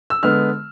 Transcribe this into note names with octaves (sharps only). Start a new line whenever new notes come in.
E6
D3 G#3 B3 F6